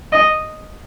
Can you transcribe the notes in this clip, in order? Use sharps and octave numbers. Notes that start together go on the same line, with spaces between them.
D#5